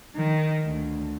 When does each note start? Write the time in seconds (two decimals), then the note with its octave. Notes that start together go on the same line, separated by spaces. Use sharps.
0.16 D#3
0.66 D2